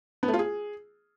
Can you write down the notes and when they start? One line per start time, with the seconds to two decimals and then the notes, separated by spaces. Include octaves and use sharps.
0.23 B3
0.28 A3
0.34 F4
0.39 G#4